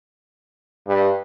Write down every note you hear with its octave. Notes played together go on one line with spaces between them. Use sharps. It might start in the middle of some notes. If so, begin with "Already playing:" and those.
G2